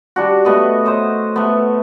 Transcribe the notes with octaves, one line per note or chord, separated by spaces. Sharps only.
G3 D4 F#4
A3 B3 D#5
C5 C#5 D#5 E5
A3 B3